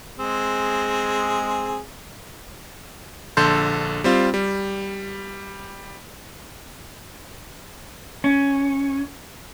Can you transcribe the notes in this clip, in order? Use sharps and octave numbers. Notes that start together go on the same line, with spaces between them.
G#3 C4 G#4
A#1 D3 A4 C6 G6
G3 C4 F4
G3
C#4